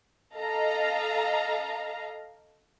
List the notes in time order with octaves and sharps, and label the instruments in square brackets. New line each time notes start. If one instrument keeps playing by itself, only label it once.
[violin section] A4 D#5 F5 A#5